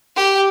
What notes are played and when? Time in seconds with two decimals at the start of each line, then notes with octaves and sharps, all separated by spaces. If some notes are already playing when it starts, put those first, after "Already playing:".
0.16 G4